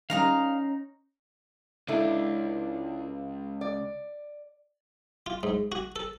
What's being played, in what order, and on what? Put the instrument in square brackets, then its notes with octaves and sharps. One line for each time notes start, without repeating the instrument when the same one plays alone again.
[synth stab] D#3 G3 [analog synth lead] C#4 [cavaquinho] D#4 A#5 D#6 [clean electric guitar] F5
[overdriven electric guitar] C#2 [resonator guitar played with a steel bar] D4 E4 A4
[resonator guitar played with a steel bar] D5
[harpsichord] F4
G#2
F#4
A4